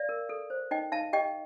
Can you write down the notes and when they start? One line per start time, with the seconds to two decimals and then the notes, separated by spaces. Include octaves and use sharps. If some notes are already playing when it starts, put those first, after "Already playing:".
Already playing: D5 F5
0.09 A#4
0.29 A4
0.50 C5
0.71 D#4 D#5 G5
0.92 D#4 F5 A5
1.13 G4 D#5 G5